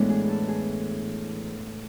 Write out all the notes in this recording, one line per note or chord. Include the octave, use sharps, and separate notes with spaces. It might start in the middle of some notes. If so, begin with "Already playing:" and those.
Already playing: A2 E3 G#3 B3 D4
G#4
A4
G#4